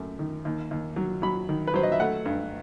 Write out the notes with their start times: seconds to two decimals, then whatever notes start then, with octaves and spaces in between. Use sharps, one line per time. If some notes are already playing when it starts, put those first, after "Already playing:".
Already playing: F#2 A3
0.19 D#3
0.45 D#2
0.71 D#2
0.96 F#3
1.22 F#3 B5
1.49 D#3
1.67 B4
1.74 F#3 C5
1.83 D#5
1.92 E5
2.00 A3 F#5
2.25 G2